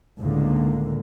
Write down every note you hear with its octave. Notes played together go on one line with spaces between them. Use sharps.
C#2 A2 D3 D#3 A#3